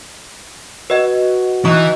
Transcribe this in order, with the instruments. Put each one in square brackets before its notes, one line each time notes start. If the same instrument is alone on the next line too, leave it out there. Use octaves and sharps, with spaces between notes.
[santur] F#4 [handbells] B4 D#5
[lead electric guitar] E3 [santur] D#4 [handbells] C#6 F#6